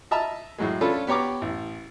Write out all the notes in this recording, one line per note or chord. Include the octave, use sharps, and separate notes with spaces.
D#5 E5 A5 A#5 E6
A2 F#3 G#3
C#4 D4 F4 A4 B4
B3 G4 C#5 A#5 D6
A1